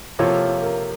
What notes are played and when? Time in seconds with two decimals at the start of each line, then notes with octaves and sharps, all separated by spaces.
0.19 C3 F3 A#3 F4 A4 C#5
0.62 A#4